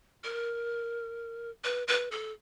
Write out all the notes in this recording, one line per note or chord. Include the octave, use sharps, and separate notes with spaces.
A#4
B4
B4
A4